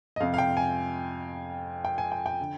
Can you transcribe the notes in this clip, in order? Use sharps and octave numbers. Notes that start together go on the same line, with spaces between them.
D#5
F2 C3 F3 F5
F5
G5
G#5
G5
G#5
G5
G5
D3